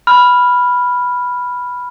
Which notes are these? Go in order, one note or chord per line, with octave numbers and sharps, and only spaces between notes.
B5 F6